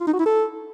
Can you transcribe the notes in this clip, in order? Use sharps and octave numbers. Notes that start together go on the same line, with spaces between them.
F4
D#4
F#4
E4
A4